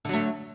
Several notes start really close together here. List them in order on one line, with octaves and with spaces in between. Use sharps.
D3 F#3 A3